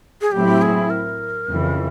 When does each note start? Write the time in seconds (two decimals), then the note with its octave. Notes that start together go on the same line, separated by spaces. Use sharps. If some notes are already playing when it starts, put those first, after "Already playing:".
0.21 G#4
0.32 A2 F#3 A3 C4 E4 G4
0.62 G#4
0.90 A#4
1.49 F2 C#3 E3